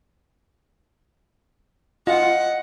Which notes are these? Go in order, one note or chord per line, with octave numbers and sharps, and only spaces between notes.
F4 D#5 F#5